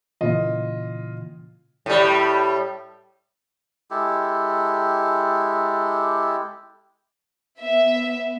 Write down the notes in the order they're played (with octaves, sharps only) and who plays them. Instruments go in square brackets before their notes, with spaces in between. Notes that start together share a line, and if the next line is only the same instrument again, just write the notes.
[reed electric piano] A#2 C#3 E3 [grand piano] F4 D#5
[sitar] A2 G3
[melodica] G#3 E4 G4 A4
[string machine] B3 [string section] E5